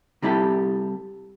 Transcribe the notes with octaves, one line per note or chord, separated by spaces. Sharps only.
C3 G3 E4 G4 A4